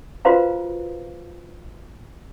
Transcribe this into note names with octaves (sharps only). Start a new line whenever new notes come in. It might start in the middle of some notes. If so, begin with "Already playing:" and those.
F4 F#4 B4 C5 F5 A#5